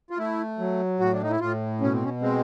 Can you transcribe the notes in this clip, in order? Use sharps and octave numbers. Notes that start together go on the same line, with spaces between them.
F4
A3 E4
F#3
A2 F#4
D4
D#4
E4
A2 F4
B2 C#4
C4
C#4
G#3 C4